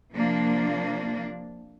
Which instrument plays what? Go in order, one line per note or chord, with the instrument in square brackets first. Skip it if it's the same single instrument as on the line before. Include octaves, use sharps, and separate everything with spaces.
[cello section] C3 F3 A#3 D4